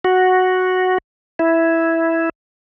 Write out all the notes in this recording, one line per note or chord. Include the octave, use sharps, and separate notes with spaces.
F#4
E4